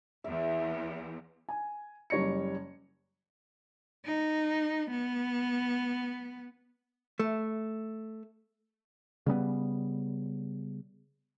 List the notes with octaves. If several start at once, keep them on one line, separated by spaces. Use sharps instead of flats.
E2 E5
G#5
F#1 G3 C#5 A#6 C#7
D#4
B3
A3
C#3 G3 G#3 B3